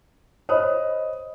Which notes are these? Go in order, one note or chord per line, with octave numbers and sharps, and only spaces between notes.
C5 C#5 D#5 B5 D#6